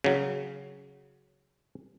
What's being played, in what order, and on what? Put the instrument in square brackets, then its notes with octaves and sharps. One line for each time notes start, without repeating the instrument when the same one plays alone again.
[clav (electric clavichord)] C#3 F#3